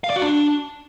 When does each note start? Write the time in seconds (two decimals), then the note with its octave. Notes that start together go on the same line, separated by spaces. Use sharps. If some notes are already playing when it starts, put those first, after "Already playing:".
0.04 F5
0.10 D5
0.16 F#4
0.22 D4